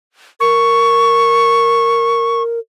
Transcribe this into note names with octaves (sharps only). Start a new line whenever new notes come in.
A#4 C#6